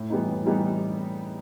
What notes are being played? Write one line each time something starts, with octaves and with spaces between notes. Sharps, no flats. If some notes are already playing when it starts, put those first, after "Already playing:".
Already playing: A2
E3 G3 B3 D#4
A2
E3 G3 B3 D#4